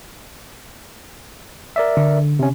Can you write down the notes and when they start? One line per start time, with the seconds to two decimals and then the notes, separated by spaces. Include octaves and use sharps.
1.76 A#4 D5 E5
1.97 D3
2.39 C3 C#4